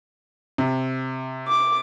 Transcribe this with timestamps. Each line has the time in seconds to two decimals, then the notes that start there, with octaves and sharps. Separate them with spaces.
0.58 C3
1.48 D6